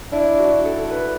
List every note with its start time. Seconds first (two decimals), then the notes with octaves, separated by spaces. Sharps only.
0.12 D4 E4
0.38 F#4
0.65 A4
0.91 B4